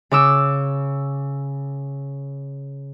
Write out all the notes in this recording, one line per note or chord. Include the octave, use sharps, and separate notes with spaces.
C#3 D6 E6